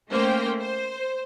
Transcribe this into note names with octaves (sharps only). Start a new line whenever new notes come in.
A3 A#3 C#4 C5 G5
C5